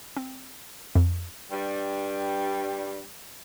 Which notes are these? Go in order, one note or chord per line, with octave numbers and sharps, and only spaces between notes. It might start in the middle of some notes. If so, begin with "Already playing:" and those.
C4
F2
G2 G3